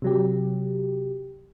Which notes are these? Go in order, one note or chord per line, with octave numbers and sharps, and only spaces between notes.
C3 F#3 G4